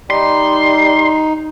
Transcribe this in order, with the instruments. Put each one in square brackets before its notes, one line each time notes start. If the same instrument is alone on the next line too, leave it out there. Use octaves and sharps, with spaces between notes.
[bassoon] G3 [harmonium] D#4 [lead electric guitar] C6